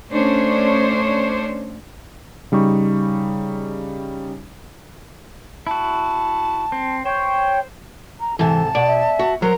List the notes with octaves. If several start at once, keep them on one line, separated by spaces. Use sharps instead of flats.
A3 C#4 D4 C5 C#5
C#3 G3 D#4 C#6
E4 F#4 A5
C4
C5 C#5 G5
A#5
G#2 C3 E3 A4 A5
B2 D5 F#5
E5
F#4
F#3 A#4 C5 A#5